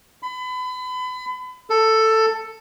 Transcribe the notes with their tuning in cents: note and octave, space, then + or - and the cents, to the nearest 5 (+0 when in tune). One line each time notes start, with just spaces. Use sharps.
B5 +35
A4 +10